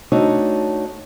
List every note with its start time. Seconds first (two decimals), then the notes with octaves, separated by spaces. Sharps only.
0.12 A3 D4 D#4 F#4 C#5